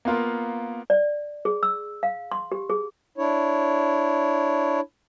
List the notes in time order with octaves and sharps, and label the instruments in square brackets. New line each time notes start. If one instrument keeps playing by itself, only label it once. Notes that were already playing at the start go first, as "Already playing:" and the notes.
[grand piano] A#3 B3 F4 A#4
[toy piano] D5
G#4
E6
F5
C6
G4
G#4
[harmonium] D4 E4 C#5